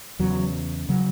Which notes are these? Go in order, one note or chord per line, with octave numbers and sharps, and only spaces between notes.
E2 C#3 F#3
C#3 F#3